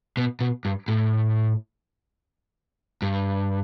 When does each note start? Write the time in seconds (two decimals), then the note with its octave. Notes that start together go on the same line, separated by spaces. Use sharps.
0.17 B2
0.40 B2
0.65 G2
0.88 A2
3.02 G2